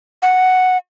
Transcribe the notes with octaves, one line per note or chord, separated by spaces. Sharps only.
F#5